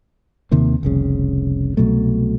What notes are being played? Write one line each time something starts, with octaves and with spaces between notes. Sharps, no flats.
D#2 C3 D#3 A#3
F1 C2 C#3
C2 B2 F#3 A3